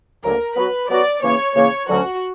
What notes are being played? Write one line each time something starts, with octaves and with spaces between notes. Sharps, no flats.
D2 C#3 F#3 A#3 A#4
F#3 B3 F#4 B4
F#3 B3 F#4 D5
C#3 E3 A#3 C#5
C#3 E3 A#3 C#5
D2 D3 F#3 C#4 F#4